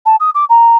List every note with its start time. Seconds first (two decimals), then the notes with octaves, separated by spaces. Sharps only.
0.06 A5
0.20 D#6
0.35 D6
0.49 A#5